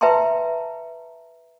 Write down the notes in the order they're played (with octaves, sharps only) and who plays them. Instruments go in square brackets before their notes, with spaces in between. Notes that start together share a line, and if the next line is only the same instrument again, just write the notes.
[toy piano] B4 E5 G5 A5 A#5 C6